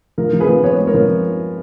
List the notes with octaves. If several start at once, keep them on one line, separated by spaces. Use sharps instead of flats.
F3 A#4
F3
G#4 B4
F3
B3 C#5
G#3 B4
A#4 C#5
F3